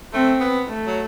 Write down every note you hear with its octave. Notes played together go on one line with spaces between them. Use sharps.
A3 C4
B3
A3
F#3